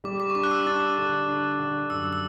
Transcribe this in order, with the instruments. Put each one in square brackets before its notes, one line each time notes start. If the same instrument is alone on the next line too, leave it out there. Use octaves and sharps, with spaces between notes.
[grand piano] G3 [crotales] D6
[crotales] D6
C#6
[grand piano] D4 [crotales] D6
[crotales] F#6
E6
[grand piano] D4 [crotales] A6
[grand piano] D3
D4
D3
[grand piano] F#2 [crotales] E6
[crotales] E6